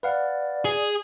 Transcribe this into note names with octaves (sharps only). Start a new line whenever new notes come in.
B4 D5 F5 F#5
G#4